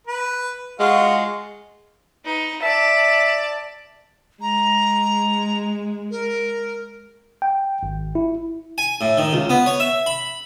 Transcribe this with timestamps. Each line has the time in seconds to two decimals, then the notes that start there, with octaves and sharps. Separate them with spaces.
0.07 B4
0.79 G#3 F4 F#4
2.25 D#4 B4
2.62 D5 E5 A5
4.41 G#3 A#5
6.11 A#4
7.42 G5
7.83 G#1
8.15 E4
8.78 G#5
9.01 A2
9.17 D#3
9.33 C#2
9.50 B3
9.66 C#5
9.80 E5
10.06 B5